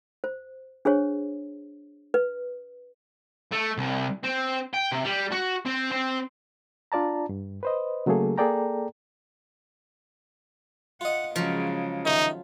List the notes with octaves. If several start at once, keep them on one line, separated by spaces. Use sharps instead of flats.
C5
D4 G#4 C5 C#5
B4
A3
C2
C4
G5
C3
G3
F#4
C4
C4
D4 F4 D5 A5 A#5
G2
B4 C5 D#5
C#3 F#3 A3 A#3 G#4 A4
A#3 G#4 A4 D5 G5 A#5
F4 D#5 F#5
C#3 F3 F#3 G#3
C3 D#3 D#4